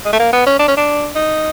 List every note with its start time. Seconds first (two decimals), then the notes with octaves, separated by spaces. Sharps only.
0.05 G#3
0.13 A3
0.19 A#3
0.32 B3
0.46 C#4
0.59 D4
0.68 C#4
0.77 D4
1.15 D#4